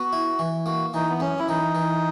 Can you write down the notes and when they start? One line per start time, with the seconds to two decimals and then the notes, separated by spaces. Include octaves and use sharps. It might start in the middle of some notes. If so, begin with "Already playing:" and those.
Already playing: B3 F#4
0.13 E4
0.39 E3
0.66 A#3 F#4
0.94 E3 D#4
1.09 B3
1.20 F#2 C#4
1.39 E4
1.49 E3 D#4
1.75 E3